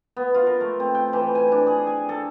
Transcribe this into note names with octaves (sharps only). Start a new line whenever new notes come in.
B3
F4
A#4
A3
C4
G5
E3
G#5
D4
G#4
G#5
A4